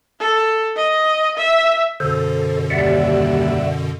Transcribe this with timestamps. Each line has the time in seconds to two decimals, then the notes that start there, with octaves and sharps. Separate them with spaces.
0.20 A4
0.76 D#5
1.37 E5
2.00 F#2 B2 D3 A4 C5
2.70 D#2 G3 D5 E5 F#5